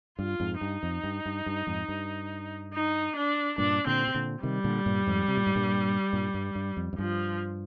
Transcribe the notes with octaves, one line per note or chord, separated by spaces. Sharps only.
G2 F4
F2 G#2
G2 D#4
F2
G2
G2
G2
F2 G#2
G2
D#4
D4
G2 A#2 D4
A#2 D3 C4
C3
A#2 D3
C3 D#3 G3
A#2 D3
G2 A#2
F2 G#2
C3
A#2
G#2
G2 A#2
G2 A#2
G2
G2
F2
F2
G2 F3